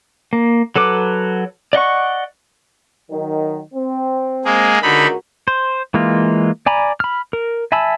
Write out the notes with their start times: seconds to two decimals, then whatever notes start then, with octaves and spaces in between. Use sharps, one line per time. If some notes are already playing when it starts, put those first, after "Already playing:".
0.33 A#3
0.76 F#3 A4 B4 D6
1.73 D5 D#5 F#5 C#6
3.09 D#3 F#3
3.74 C4
4.45 G#3 A#3 G#4
4.82 C#2 D3 D#4 F#4 A#4 B5
5.48 C5
5.94 E3 G#3 A#3 F4
6.66 D5 G#5 A#5 B5
7.00 B5 F6
7.33 A#4
7.72 E5 G#5 A5 B5 E6